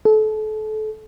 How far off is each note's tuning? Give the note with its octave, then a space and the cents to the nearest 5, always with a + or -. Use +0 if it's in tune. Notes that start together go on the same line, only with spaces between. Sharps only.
A4 -30